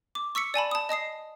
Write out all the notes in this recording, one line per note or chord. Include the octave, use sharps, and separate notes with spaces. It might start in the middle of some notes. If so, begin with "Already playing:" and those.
D6
C#6 E6 B6 C#7
D5 G#5 A5 B5
A5 D#6
D#5 A5 D#6 C7